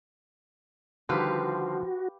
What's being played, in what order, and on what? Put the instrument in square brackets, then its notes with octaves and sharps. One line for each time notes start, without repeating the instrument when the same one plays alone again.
[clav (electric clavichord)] D3 D#3 G3 [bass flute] F3 [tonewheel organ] F#4 [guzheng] G4 B4 F5